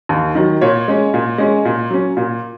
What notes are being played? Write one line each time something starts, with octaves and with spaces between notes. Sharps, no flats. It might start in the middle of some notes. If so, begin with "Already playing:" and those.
D#2
D#3 F#3
A#2 C#5
G#3 C#4
A#2
G#3 C#4
A#2
F#3 C#4
A#2